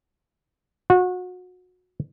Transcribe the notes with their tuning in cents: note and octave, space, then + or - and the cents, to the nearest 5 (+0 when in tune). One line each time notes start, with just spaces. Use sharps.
F#4 -30